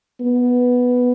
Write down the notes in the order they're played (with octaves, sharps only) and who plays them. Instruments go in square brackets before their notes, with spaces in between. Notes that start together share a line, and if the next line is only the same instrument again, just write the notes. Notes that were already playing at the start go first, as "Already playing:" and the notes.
[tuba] B3